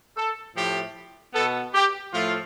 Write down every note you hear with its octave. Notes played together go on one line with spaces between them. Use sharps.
A4
A2 F3 A3 G4
B2 B3 A4
G4
A2 F3 A3 F4